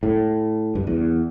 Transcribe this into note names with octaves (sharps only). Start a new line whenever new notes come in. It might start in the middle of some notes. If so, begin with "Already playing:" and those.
A2
G2
E2